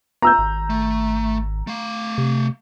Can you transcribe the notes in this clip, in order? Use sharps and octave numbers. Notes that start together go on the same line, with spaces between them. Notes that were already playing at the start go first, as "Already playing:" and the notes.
B3 A#5 E6 G6
G#1
A3
A3 F5
C3